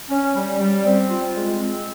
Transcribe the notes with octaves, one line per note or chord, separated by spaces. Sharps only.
C#4
G3
G3
C4
F4
G#3
C4